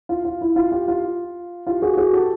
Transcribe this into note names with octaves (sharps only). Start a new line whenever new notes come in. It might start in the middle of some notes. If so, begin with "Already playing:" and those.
F4
F4
E4
F4
F4 G4
F4
F4 G4
F#4 G#4
F#4 G#4
G4 A4